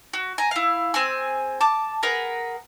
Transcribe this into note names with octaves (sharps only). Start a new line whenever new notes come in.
F#4
G#5 A#5
E4 F5
C4 G#4 G#5
A5 D6
G#4 A#4 B4 F#5